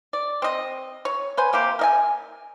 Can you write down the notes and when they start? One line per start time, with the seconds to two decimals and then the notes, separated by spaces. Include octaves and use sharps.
0.13 D5
0.42 C4 D#5
1.05 C#5
1.37 B4 C5 G#5
1.53 C3 A#3 G4
1.79 A#4 D#5 G#5